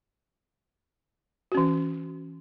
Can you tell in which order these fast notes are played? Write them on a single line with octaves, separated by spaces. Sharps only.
F#4 C#4 E3